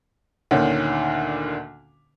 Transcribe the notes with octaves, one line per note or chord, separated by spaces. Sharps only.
D2 A#2 D3 D#3 C#4